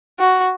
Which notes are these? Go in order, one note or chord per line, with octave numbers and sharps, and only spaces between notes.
F#4